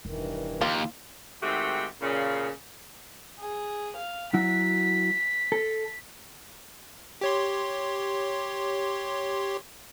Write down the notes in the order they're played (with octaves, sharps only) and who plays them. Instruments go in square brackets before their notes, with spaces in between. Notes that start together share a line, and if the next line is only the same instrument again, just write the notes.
[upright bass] E1 [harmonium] G2 D#3 E3
[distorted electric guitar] D#2 [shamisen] F4
[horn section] G#2 D#3 A3 C4 F#4 G4
A#2 C#3
[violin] G#4
F5
[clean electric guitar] F#3 E4 F#4 [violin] B6
[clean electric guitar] A4
[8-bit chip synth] G4 C#5 C6